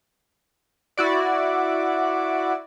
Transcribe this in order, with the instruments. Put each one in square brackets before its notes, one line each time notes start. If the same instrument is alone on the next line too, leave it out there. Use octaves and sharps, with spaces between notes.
[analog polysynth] E4 F#4 D5